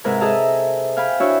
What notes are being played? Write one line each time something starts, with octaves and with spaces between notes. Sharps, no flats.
G#2 C3 E4 A#4 B4 G#5
G#4 A4 D#5 E5 A5 A#5
F5 G5 G#5 B5
D4 E4 F#4 C#5 E5 G5